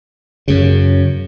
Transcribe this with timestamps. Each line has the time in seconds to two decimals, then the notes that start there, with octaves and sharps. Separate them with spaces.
0.48 F#2 C#3